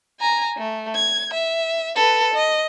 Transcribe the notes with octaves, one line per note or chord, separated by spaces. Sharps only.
G#5 A#5
A3
G#6
E5
A4 B4
D#5